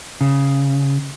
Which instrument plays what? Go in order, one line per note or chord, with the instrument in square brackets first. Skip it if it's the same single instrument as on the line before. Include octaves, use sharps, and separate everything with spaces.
[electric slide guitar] C#3